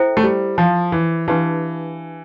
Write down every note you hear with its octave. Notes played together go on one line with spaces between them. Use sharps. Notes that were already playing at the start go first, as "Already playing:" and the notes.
Already playing: E4 A4 C5 E5 G5
A3
G3
F3
E3
E3 D4 G4 B4 F5 A5